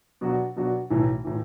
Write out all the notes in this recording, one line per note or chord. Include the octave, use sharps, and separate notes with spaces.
B2 F#3 D4 F#4
B2 F#3 D4 F#4
B1 A2 E3
A2 E3